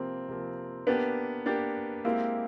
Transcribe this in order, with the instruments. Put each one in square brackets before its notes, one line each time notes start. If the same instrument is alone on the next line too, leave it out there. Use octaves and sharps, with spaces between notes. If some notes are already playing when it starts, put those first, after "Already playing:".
Already playing: [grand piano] C3 F3 A#3 [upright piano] C4
[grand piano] C3 F3 A#3
[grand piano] A#3 D4 G4 [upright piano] B3
[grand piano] A#3 D4 G4
[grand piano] G#3 C4 E4 G4 [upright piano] A#3